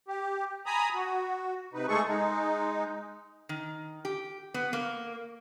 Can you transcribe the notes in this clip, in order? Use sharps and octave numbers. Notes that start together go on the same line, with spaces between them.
G4
G#5 A#5 B5 D#6
F#4
C3 D#4 B4
G#3 A3 G#4 A4 C#6
G#3 D#4
D#3
G4
B3
A#3